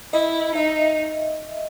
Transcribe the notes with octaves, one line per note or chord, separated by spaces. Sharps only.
E4 D#5
D#4 E5